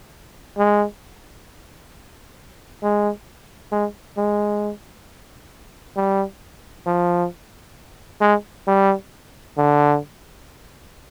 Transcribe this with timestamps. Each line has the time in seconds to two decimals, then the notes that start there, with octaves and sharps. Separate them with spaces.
0.58 G#3
2.82 G#3
3.72 G#3
4.17 G#3
5.96 G3
6.86 F3
8.21 G#3
8.67 G3
9.57 D3